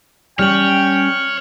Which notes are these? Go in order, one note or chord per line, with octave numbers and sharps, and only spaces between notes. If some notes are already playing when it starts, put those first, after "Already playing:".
G3 C#4 C#5 G5 F6 F#7